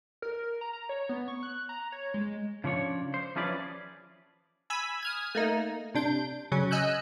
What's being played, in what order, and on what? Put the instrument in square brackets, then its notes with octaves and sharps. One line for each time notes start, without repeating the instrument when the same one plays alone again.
[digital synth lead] A#4
A#5
A#5
C#5
B3
C#6
F#6
A#5
C#5
G#3
[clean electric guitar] C#3 F3 D4 C#5
C5
E3 F3 C#4 G#4 B4 D5
[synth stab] G#5 B5 E6 G#6 B6
D#6 F6 G#6
A3 A#3 D#4
C3 D4 G6
C#3 F#3 C#4
D#5 G#5 E6 F#6 G6